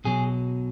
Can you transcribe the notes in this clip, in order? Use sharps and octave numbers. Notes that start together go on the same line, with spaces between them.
B1 B2 F#3 G#4